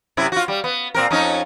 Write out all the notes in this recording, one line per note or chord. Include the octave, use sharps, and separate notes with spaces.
F#2 C3 E4
F4 F#4
G3
B3
A#2 C4 A#4
F2 C#4 D#4